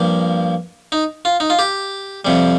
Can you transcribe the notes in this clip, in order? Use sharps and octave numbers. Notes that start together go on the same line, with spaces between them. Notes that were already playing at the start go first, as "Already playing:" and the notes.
Already playing: G2 F3 A#3
D#4
F4
D#4
F4
G4
F2 C3 G3